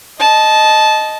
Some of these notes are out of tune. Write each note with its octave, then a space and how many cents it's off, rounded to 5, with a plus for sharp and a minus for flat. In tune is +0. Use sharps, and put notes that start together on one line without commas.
D#5 +0 A5 -15